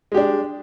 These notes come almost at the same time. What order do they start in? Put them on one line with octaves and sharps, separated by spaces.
G#3 G4 D4